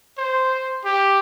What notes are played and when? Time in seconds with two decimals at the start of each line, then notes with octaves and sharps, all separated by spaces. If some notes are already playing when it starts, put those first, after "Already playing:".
0.18 C5
0.85 G4